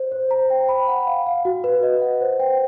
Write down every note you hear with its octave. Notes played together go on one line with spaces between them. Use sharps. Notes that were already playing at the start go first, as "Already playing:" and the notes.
Already playing: C5
C5
A#5
G5
B5
F#5
F5
F5
F#4
B4
D#5
F#5
C5
G5